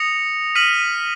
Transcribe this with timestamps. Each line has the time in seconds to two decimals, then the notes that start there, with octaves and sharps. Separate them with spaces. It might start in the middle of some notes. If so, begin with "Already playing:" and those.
Already playing: D#6 A#6 C#7 F7
0.55 F6 B6 D#7 F#7